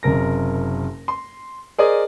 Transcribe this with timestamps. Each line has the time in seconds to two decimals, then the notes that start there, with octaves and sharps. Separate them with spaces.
0.03 F#1 F#2 C3 A#4 A#6
1.08 C6
1.78 G#4 A#4 C5 D5 D#5